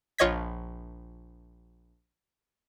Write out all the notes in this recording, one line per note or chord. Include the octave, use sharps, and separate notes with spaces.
A#1 F4 C#5 D#5 G#6 B6